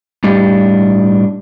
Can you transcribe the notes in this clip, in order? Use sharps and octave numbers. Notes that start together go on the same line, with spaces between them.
A2 G3 D4 G4 D#5